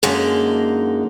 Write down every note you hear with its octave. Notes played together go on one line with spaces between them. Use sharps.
F#2 D3 G#3 A#3 D#4